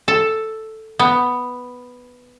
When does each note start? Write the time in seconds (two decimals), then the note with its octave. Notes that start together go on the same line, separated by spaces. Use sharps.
0.08 A4
0.99 B3